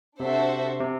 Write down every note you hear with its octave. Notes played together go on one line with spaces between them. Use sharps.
C3 D4 F#4 A4 C5 E5
C3